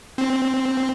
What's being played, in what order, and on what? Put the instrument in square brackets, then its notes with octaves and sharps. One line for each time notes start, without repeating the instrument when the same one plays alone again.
[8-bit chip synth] C4